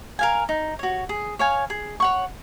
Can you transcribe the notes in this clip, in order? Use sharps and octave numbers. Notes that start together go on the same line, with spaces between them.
A#4 F5 G#5
D#4
F#4 C#5
G#4
C#5 F5 G#5
G#4
C#5 F#5 C#6